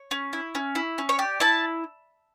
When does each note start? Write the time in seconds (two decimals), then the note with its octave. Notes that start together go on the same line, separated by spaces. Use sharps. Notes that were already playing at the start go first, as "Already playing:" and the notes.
Already playing: C#5
0.11 C#4
0.33 E4
0.55 C#4
0.75 E4
0.98 C#4
1.09 C#5
1.19 G4 D5
1.40 E4 A5